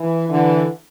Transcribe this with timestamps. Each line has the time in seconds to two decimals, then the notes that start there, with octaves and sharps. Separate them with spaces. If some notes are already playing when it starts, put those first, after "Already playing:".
Already playing: E3
0.29 D3 E3